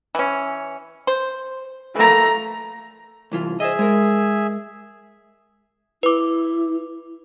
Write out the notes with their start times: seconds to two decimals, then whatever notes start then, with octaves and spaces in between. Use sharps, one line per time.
0.15 E3 C#4
1.07 C5
1.95 E3 A3 A#3 A#5
3.32 C2 E3 F4
3.60 G#4 C5 D#5 E5
3.79 G#3 A#4
6.03 E4 B4 D6